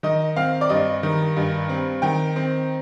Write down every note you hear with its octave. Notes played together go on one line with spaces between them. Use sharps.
D#3 D#5
C4 F5
D5
G2 D#5
D#3
G2
C4
D#3 G5
C4